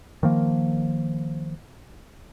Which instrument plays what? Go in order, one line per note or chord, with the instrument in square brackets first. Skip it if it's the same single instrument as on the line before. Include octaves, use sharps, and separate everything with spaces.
[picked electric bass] D#3 F3 A#3